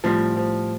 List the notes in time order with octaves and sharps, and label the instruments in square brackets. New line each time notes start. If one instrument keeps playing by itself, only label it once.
[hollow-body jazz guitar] A2 G3 C4 [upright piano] F3
[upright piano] F3